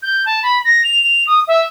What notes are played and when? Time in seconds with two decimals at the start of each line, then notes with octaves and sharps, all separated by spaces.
0.02 G6
0.26 A5
0.43 B5
0.65 A#6
0.84 F7
1.27 D#6
1.48 E5